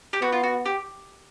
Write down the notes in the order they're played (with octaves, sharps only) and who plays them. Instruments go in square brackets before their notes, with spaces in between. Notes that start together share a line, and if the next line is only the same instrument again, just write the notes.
[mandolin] G4
[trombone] B3 [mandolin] F#4
[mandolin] F4
F#4
G4